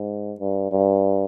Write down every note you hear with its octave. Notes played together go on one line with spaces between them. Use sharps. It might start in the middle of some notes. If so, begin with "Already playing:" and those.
Already playing: G#2
G2
G2